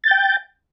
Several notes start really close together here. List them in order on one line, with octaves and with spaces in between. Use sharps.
A6 G6 G5